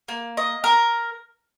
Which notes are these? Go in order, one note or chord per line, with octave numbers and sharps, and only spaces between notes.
A#3
D#5
A#4